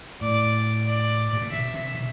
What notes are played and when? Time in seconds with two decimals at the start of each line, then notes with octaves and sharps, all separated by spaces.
0.21 A2 D5
0.86 D5
1.33 G2
1.42 A2
1.51 B2 E5
1.74 C3
1.95 B2